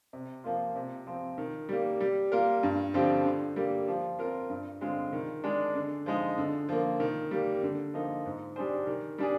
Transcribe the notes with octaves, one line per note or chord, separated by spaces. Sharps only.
C3
F3 A#3 F4
C3
F3 C4
D#3
G3 A#3
G3
A#3 F4 A#4
G2
D3 F3 C4 G4
D3
G3 A#3
F3
C4 F4 A#4
G2
D3 G#3 C4 F4
D#3
G#3 D4
D3
F3 G#3 D#4
D3
F3 A#3
D#3
G3 A#3
D3
F3 A#3 D#4
G#2
G3 D4 G#4 C5
D#3
G3 D4 G#4